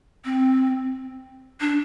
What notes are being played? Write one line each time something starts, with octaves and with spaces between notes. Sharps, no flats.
C4
D4